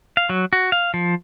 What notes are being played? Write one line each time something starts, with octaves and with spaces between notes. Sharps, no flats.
F5
F#3
F#4
F5
F3